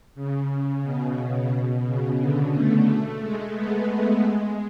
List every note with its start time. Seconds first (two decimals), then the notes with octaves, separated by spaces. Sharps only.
0.15 C#3
0.82 B2
1.17 C#3
1.50 B2
1.84 C#3
2.19 D3
2.53 A3
2.86 A3
3.20 G#3
3.54 B3
4.22 G#3